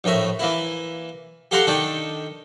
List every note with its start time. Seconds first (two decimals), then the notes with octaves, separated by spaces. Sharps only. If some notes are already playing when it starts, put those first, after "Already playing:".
0.04 A#1 A2 A#4 E5
0.39 E3 A#3 E4
1.51 G4 A4 F5 F#5 A#5 C6
1.67 D#3 D4 A4 G5